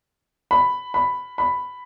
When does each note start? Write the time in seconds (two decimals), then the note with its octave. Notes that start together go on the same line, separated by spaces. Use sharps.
0.51 B5
0.94 B5
1.38 B5